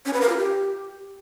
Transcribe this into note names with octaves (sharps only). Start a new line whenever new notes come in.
C#4
B4
A#4
F4
G4